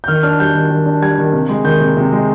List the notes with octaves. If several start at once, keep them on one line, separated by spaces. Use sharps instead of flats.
G6
D#3 F6
D4 F6
G3 G6
D#3
D#3
D4
G3 G#6
D#3
C3
G#3
D#3 G6
C3
C3
G#3